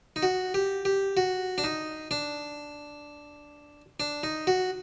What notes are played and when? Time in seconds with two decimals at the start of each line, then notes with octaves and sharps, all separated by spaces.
0.16 D#4
0.23 F#4
0.54 G4
0.85 G4
1.17 F#4
1.58 D4
1.64 D#4
2.11 D4
4.00 D4
4.23 D#4
4.47 F#4